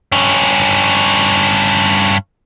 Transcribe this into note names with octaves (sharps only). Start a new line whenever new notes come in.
G2 C#4